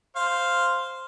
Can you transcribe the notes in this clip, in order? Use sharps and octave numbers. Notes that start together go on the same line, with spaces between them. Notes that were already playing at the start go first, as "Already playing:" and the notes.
C5 F5